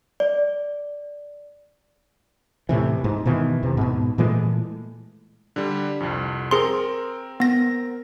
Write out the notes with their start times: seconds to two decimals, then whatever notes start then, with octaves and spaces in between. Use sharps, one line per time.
0.20 D5
2.69 A2 C3 E3
3.04 G#2
3.26 B2 D#3 E3
3.63 D#2 C3
3.77 G#2 B2
4.18 A#2 E3 G#3 A3
5.56 D3 G3
6.00 C2 F2
6.51 C4 G#4 A#4 C6
7.40 B3 A#6